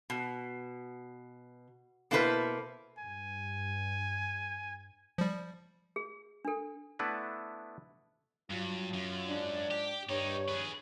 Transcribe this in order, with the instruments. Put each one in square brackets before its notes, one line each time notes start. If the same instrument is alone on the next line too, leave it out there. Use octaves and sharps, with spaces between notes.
[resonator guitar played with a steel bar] B2
B2 A#3 E4 A4 B4 C5
[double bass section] G2 [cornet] G#5
[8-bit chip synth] F3 G3
[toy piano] G#4
D4 A4
[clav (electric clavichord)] A3 B3 D4 E4 B4
[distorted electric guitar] G2 [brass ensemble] F#3 F4
[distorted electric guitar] F#2
[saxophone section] G#2 D4
[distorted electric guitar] G4
[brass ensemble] G2 [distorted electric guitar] D#4 G4 [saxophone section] C#5
[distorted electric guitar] G#4 B4